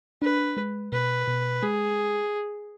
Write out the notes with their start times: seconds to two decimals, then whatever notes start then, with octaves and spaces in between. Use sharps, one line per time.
0.22 D4 B4
0.57 G#3
0.92 B2 B4
1.27 B2
1.63 G#3 G#4